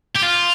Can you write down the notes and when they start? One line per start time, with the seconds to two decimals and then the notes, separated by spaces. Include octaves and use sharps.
0.15 G4
0.22 F4